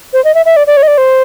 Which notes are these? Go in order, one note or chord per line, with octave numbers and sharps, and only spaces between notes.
C5
D#5
E5
E5
D5
D5
C#5
D#5
D5
C5